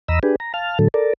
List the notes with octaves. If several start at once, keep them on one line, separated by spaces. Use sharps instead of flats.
E2 D#5 A#5 B5 E6
D4 G4 G#4 B4
A#5
F5 A5 F6
A2 D3 F#3 A4
A4 A#4 D5